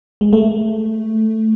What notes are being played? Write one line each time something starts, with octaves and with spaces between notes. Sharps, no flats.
G#3
A3